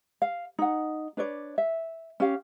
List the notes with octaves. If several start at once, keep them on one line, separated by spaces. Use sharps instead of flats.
F5
D#4 F#5
D4 B4 C#5 D5
E5
C#4 G4 F5